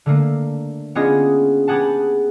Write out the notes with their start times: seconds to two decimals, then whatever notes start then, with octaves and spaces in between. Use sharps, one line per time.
0.06 D3 A3 A#3
0.95 B3 C#4 D4 F4 G#4 D#5
1.68 B3 G4 G#4 F#5 A5